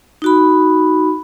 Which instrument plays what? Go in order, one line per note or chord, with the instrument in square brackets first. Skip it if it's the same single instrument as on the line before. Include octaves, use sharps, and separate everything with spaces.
[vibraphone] D#4 F#4 B5